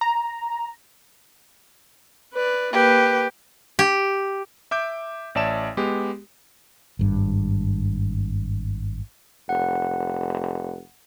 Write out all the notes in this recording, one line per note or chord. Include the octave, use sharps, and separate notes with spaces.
A#5
B4 D5
A#3 G4 B4
G4
E5 D6 G6 D7
A1 C#5 D5 E5 A5 E7
G#3 B3 G4
G#1 G2
F1 F#5